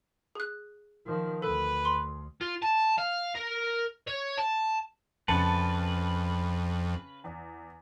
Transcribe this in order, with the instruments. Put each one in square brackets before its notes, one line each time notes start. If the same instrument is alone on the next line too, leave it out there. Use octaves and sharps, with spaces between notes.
[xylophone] G#4 F#6
[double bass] D#3 F3
[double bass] D2 [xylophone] A4 [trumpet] B4
[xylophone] C6
[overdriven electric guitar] F4
A5
F5
A#4
C#5
A5
[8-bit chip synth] F2 [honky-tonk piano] C#3 A5 C#7 [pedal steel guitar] B4
[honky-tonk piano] E2